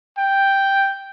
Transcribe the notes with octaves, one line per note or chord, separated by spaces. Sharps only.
G5